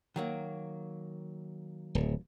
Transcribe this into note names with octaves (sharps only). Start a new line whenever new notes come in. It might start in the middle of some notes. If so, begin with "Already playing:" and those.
D#3 F#3 A#3
D1